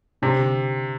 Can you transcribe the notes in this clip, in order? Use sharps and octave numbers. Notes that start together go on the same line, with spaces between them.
C3 D4
D3